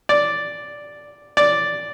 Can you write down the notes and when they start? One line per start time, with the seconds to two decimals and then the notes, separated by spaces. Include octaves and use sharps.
0.09 D5
1.37 D5